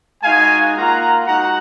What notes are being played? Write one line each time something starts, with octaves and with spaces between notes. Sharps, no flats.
G#3 D#4 F#4 F5 G#5
A#3 F4 F#5 A#5
G#3 D#4 F#4 F#5 A#5